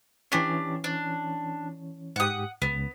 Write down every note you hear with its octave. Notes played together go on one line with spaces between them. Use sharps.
E3 C#4 D4 G4 C#5
D4
G#2 G4 F#5 D#6
C#2 B3